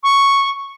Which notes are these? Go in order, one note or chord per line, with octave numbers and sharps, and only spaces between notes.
C#6